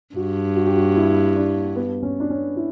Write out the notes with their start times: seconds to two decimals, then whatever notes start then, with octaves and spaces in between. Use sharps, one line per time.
0.15 G2 F#4
0.56 F#4
0.67 G4
0.77 F#4
0.96 E4
1.36 D4
1.76 B3
2.03 C#4
2.20 D4
2.30 C#4
2.56 E4